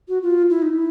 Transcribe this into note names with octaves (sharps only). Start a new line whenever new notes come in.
F#4
F4
E4
D#4
E4